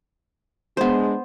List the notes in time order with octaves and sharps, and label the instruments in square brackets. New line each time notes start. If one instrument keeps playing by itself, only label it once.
[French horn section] G#3 D4 [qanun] B3 C5